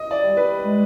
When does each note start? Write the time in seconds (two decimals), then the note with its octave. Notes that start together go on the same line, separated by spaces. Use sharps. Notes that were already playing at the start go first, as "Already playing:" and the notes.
Already playing: D#5
0.11 D5
0.24 G3
0.37 B4
0.64 G#3